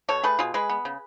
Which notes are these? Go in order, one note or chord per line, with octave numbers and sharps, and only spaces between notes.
B2 A4 C#5
A3 G#4 B4
B2 F4 G#4
G#3 G#4 B4
B3
C#3